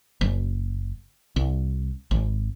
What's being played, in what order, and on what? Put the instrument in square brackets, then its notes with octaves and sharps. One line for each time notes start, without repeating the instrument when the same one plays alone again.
[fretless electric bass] F#1
C2
G#1